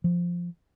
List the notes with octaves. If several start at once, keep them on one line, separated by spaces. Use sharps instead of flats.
F3